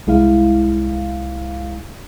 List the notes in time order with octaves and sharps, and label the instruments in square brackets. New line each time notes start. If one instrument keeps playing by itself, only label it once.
[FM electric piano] C2 G#3 E4 F5